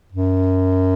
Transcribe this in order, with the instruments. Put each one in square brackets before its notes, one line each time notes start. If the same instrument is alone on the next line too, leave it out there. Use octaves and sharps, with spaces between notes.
[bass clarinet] F#2